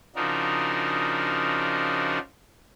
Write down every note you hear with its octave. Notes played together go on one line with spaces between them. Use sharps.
C#3 F3 D4 D#4 F#4 A#4